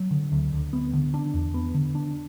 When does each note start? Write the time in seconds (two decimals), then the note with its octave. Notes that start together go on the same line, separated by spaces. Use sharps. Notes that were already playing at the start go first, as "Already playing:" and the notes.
Already playing: F#3
0.11 D3
0.32 D2
0.53 D2
0.73 B3
0.93 D3
1.14 D4
1.34 E2
1.54 B3
1.74 D3
1.95 D4